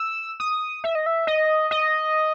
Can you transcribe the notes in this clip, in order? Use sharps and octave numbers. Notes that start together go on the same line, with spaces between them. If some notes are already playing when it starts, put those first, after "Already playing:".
Already playing: E6
D#6
E5
D#5
E5
D#5
D#5